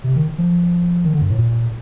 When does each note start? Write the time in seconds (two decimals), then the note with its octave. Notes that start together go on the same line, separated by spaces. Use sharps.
0.04 C3
0.16 D#3
0.38 F3
1.05 D#3
1.14 D3
1.21 G2
1.30 A2
1.38 A#2